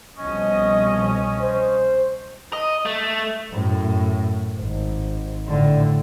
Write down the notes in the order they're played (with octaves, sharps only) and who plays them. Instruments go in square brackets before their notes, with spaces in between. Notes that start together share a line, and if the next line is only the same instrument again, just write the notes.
[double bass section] C2 B2 F3 [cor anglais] C#4 [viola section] D#5
[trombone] C5
[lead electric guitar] D#5
A3
[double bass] F#2 A2
G#1
A2 D3